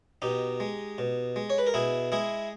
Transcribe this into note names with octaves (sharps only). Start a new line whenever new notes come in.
B2 D#4 G4
G#3
B2
G#3
C#5
B4
A#4
B2 E4 G#4
G#3 E4 G#4